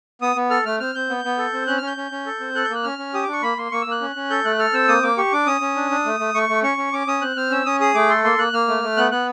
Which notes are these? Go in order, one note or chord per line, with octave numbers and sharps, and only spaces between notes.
B3 D#6
B3
A4 F6
A3 F6
C4 F6
C4 G6
B3
B3
A4
C4
C#4 F#6
C#4 F6
G6
C#4
C#4
A4
C4
A4 F#6
G6
A#3 F#6
C#4 F6
C#4
G4 D#6
D4 D6
C#6
A#3 B5
A#3 C6
A#3 C#6
E6
A#3 F#6
C#4
C#4
A4 G6
A3 F#6
A4 F6
C4 E6
A#3 D#6
A#3 D6
G4 C#6
D4 D6
C#4 D#6
C#4
D4
D4
A3
A3
A3 C#6
A3
C#4 C#6
C#4
C#4 D6
C#4 D#6
C4 F#6
C4 F6
C#4 E6
C#4 D#6
G#4 D#6
A3 D6
A4 C6
A#3 C6
A#3 F#6
A#3 F6
A3
A3
B3 F#6
B3 F#6